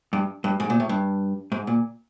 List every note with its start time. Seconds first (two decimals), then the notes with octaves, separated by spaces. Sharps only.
0.13 G2
0.44 G2
0.60 G#2
0.70 A#2
0.80 A2
0.89 G2
1.52 G#2
1.67 A#2